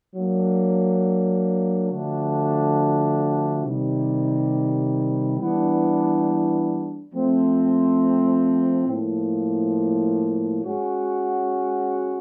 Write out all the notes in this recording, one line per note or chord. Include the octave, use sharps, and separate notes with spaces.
F#3 A#3 D4
D3 F3 A3 D4 F#4
C3 D#3 G3
E3 G3 B3 D4
F3 A3 C4
A2 F3 A#3
G#3 C#4 F#4